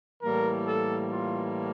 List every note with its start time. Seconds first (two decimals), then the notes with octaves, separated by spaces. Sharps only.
0.23 A2 E3 G3 A#3 A#4
0.67 A4
1.12 F4